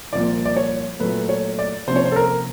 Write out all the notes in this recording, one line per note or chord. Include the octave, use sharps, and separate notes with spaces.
C2 A#2 F3 A#3 D5
D5
C#5
A#2 F#3 A3 B4
C#5
D5
C3 F3 A#3 C#4 C5
C#5
C5
A4
A#4